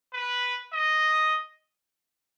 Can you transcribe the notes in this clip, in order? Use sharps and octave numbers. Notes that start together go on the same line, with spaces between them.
B4
D#5